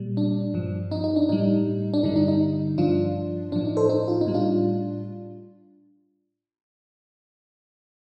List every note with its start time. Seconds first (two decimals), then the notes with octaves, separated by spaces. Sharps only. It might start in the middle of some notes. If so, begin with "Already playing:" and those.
Already playing: A#2 G3
0.17 D4
0.54 G2 F3
0.91 D#4
1.04 D#4
1.16 D4
1.29 A2 G3 D#4
1.94 D4
2.03 G2 D3 G3 D#4
2.16 D#4
2.28 D#4
2.78 G2 F3 D4 F4
3.52 A2 F3 D4
3.65 D#4
3.77 A4 C5
3.89 D#4
4.08 F4
4.21 D#4
4.27 A2 G3
4.34 D4 F4